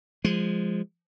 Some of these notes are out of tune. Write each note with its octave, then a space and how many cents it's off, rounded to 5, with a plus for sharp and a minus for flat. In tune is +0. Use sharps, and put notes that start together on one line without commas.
F3 +0 G#3 -15